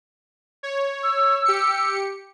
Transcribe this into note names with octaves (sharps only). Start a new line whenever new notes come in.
C#5
E6
G4 C#7